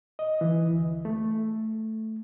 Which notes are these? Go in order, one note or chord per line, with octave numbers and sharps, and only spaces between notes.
D#5
E3
D2
A3